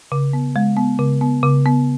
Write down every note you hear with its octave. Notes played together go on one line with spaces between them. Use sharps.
C#3
B3
G#3
B3
C#3
B3
C#3
B3